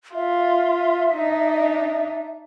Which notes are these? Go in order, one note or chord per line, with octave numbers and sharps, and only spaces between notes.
F4 E5
D4 D#4 D#5